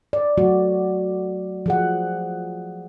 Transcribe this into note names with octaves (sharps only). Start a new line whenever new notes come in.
D5
F#3 A3 F#4
F3 G#4 F#5